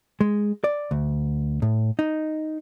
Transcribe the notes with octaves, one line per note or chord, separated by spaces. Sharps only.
G#3
D5
D2
A2
D#4